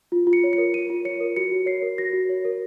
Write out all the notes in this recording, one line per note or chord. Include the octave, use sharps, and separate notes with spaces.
F4
F4
C#7
C#5
C#7
A#4
F4 D#7
F4
C#5 C#7
A#4
F#4 C#7
F#4
C#5 C7
A#4
F#4 A#6
F#4
C#5
A#4